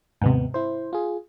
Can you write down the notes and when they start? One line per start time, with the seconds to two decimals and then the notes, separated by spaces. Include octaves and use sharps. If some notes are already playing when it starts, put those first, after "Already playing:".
0.21 D#2 G#2 C3 B3
0.54 E4 C5
0.93 F4 G#4